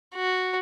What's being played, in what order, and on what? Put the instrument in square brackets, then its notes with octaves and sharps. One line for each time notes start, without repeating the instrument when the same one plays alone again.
[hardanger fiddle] F#4